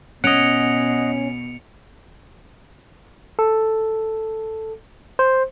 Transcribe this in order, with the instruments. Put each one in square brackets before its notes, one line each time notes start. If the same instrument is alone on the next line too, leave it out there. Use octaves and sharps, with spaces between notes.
[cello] B2 [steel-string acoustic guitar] C#4 [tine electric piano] D#5 F#5 [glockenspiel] C#7 D7 F7
[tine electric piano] A4
C5